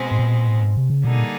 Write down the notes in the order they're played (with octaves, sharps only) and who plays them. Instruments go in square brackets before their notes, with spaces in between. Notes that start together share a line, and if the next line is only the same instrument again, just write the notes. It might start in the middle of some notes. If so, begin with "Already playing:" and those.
Already playing: [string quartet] B2 G#3 C4
[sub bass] A2
A#2
A2
G#2
C3
C#3
[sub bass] B2 [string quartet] D3 G3 A#3 D#4 G#4
[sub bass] A#2